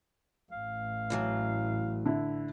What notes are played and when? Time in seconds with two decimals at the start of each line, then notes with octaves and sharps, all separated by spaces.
0.51 A1 F5
1.10 A2 E3 F#3
2.06 D3 E4